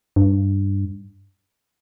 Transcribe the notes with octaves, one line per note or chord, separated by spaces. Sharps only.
G2